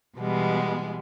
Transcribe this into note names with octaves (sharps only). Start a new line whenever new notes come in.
B2 E3 G3 G#3 B3